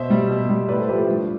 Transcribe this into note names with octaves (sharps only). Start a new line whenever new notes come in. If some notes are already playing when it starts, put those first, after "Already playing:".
Already playing: B2 C5 E5
G3
B2
G3
A2 B4 D5
A4 C5
F3 A3 G4 B4
A4 C5
G2